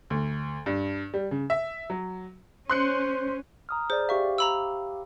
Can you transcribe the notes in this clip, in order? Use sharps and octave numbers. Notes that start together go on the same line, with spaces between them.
D2
G2
G3
C#3
E5
F#3
C#4 C5 C6 F#6 C#7
A#5 D#6 F6
G#4 C5 D5
G4 E5 F5 C#6
A#5 B5 E6